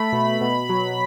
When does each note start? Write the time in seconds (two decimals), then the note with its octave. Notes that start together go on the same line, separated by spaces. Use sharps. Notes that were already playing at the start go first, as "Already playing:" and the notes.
Already playing: A3 B5
0.12 B2
0.41 B2
0.69 F#3